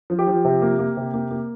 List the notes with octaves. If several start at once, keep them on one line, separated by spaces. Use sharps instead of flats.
F3
G4
F3
C3
A#3
A#3
C3
A#3
A#3